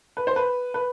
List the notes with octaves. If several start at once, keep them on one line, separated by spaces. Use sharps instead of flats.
B4
C5
B4
B4